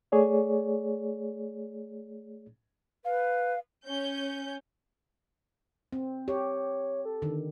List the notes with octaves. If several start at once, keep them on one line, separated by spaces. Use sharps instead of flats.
A3 G#4 C#5 D5
B4 F5
C#4 G6
C4
G4 C#5
A4
D3 D#3